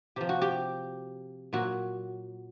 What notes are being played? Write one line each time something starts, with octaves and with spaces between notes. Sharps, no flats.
C3 F3 G4
F#4
G4
A#2 F#3 F#4